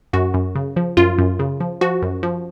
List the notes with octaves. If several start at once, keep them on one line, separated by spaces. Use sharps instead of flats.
F#2 F#4
F#2
C#3
F3
F#2 F4
F#2
C#3
F3
F3 F#4
F#2
F3